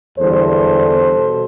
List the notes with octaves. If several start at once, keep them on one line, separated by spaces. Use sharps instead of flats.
E2 D3 G3 A4 C5
B2